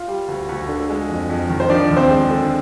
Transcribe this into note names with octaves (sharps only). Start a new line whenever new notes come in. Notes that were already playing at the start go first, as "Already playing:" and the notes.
Already playing: F4 F5
G3
D2
D2
D3
G#3
F2
F2
D#3
C5
F3 D4 D5
D#2
C4 C5
G#3
D3